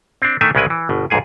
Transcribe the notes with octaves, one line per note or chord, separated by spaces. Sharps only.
C4 D4
D#3 A3 D4 E5 G#5
C2 C#3 G#3 E4 B4 G#5
E3
G1 B2
B1 F2 G#2 G#4 G#5